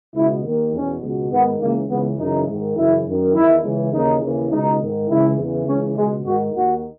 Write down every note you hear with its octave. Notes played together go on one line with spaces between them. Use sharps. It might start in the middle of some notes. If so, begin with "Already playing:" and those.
C#2 B2 E4
D#2 D#3
E2 B2 C#4
C#2 B2
G#2 D#3 B3
C#2 C#3 E3 A#3
C#2 C#3 E3 B3
F#2 C#3 E3 D#4
G#2 D#3
F#2 C#3 E3 E4
F#2 D#3
E2 D#3 E4
C#2 C#3 E3
D#2 C#3 E3 D#4
D#2 C#3 E3
C#2 B2 D#4
G#2 D#3
C#2 C#3 E3 E4
E2 C#3 E3
C#2 C#3 E3 C#4
C#2 B2 G#3
G#2 D#3 F#4
D#2 D#3 F#4